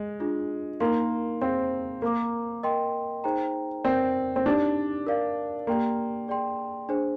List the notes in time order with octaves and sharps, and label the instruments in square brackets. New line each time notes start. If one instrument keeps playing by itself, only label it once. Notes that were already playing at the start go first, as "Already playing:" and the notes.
Already playing: [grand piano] G#3
[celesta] D4 F4 G#4
[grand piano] A#3 [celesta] D#4 A#4 F5 C6
[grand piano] C4 [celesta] G#4 C5 F5 C6
[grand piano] A#3 [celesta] A#4 F5 A#5 D6
[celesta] A#4 D#5 G5 C6
D#4 G#4 C5 G5 A#5
[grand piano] C4 [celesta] A#4 D5 G5
[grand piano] C4
[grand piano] D4 [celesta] D#4 G4 D5
[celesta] A#4 D5 F5
[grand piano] A#3 [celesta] G4 D5 G5 C6
[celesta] G#4 D5 G5 C6
D4 G#4 C5